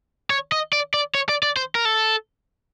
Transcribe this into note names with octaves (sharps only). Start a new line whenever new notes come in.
C#5
D#5
D5
D5
C#5
D5
D5
C5
A#4
A4